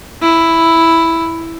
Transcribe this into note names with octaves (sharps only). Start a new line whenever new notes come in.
E4